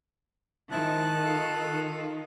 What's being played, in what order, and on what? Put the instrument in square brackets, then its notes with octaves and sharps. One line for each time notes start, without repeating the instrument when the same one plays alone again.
[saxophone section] G#2 F3 E4 [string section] D#3 [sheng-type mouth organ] A5 F#6
[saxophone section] F4 A4